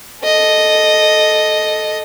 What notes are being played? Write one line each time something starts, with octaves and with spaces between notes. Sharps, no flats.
A4 D#5